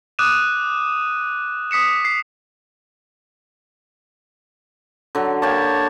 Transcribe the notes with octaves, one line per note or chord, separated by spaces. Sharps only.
D6 D#6 F#6 D#7 E7
D#6 B6 C#7 E7
C7
D3 F#3
A#3 G4 C#5 A5